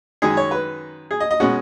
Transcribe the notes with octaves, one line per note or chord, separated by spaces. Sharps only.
F#2 D#3 G#3 G#4
C#5
B4
G#4
D#5
D#5
B2 G#3 C#4 F#4